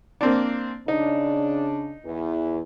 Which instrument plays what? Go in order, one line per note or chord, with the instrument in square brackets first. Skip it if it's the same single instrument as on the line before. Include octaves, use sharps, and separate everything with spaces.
[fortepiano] A#3 C4 D4
[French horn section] C#3 D4 [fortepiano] D#4
[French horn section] E2 E3